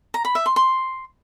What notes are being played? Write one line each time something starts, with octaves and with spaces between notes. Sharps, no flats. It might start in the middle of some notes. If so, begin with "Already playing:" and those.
A#5
B5
E5
C6
C6